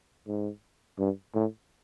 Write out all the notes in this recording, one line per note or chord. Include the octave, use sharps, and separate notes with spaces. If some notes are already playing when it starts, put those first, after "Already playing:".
G#2
G2
A2